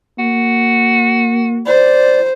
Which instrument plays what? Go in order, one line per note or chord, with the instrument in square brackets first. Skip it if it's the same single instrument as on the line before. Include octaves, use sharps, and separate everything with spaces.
[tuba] A#3 [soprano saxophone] F#4
[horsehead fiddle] C5 [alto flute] D5